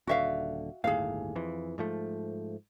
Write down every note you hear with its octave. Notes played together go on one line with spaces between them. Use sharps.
D#1 D3 F#4 E5 F5
G1 D#2 A2 G#4 F5
F2 E3
G#2 F3 A3